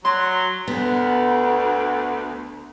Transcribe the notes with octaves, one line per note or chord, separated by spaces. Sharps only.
F#3 C6
D2 B3